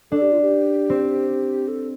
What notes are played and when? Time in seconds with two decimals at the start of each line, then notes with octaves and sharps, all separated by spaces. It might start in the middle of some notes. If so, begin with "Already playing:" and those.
0.11 D4 A4
0.22 G4
0.32 F4
0.41 G4
0.90 C4
1.68 A4